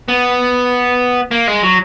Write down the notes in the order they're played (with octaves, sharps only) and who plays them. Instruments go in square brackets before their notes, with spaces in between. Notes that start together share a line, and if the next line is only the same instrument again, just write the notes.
[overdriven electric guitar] B3
A#3
G#3
F#3